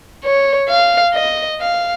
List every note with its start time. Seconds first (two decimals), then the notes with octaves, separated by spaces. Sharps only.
0.24 C#5
0.69 F5
1.14 D#5
1.60 F5